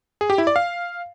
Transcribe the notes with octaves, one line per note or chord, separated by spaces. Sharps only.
G#4
G4
E4
D5
F5